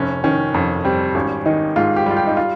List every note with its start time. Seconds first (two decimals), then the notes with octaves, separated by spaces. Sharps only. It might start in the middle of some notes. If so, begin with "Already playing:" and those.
Already playing: F1 C#4
0.24 D#3 C#4
0.54 F2 C#4
0.85 G3 C4
1.15 G#1 C#4
1.46 D#3 D#4
1.76 G#2 F4
1.96 G4
2.06 G3 F4
2.17 G4
2.27 D#4
2.37 F4